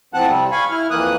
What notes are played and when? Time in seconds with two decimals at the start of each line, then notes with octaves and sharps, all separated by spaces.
0.14 A2 F3 C4 F#5 A5 F#6
0.27 C3 G3 C4
0.52 F5 G#5 B5 C#6
0.71 E4 F6
0.90 F2 E3 A#3 D#6 F#6